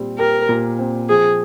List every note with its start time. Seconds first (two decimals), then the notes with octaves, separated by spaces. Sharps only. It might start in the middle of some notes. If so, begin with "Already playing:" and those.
Already playing: A#2 G3 C4
0.19 G4 A#4
0.49 A#2
0.79 C4
1.09 F3 G#4